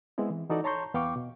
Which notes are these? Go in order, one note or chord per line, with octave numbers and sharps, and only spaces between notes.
G#3 B3 C4 E4
E3
E3 D#4 F#4 A4 D5
C#5 A5 A#5 C6 C#6 G6
E2 B3 F5 G5 C#6 D6
B2